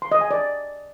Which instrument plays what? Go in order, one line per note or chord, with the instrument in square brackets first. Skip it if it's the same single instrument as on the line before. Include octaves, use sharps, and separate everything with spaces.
[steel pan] C6
D#5
G#5
D5